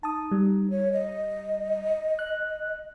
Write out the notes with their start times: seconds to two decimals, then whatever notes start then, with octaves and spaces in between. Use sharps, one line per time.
0.03 D#4 A5 D#6
0.31 G3
0.70 C#5
0.93 D#5
2.19 F#6